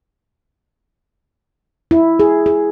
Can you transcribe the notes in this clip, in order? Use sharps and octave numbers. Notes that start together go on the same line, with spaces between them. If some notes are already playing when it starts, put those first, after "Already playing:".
E4
G#4
G#4